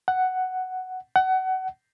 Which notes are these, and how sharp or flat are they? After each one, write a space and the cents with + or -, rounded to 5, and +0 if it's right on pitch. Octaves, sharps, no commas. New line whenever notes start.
F#5 +5
F#5 +25